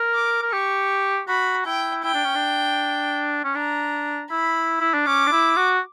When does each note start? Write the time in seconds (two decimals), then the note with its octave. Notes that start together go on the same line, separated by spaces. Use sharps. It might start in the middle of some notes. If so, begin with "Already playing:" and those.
Already playing: A#4
0.14 D6
0.42 A#4
0.52 G4 C#6
1.28 F#4 B5
1.66 E4 G5
2.04 E4 G5
2.14 D4
2.25 C#4
2.35 D4
3.44 C#4
3.55 D4 A#5
4.31 E4 B5
4.81 E4
4.94 D4
5.07 C#4 D6
5.27 D4
5.32 E4
5.57 F#4